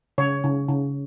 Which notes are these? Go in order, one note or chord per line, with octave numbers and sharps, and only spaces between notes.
C#3 C#5
C#3
C#3